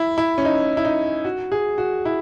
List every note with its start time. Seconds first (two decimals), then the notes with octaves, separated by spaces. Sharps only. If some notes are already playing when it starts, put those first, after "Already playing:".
Already playing: E4
0.18 E4
0.38 C#4
0.45 D#4
0.77 E4
0.85 D#4
1.25 F#4
1.52 G#4
1.78 F#4
2.05 E4